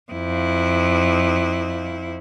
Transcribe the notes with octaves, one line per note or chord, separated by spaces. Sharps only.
F2 E4